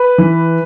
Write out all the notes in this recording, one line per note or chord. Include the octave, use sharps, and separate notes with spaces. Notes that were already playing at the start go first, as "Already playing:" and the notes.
Already playing: B4
E3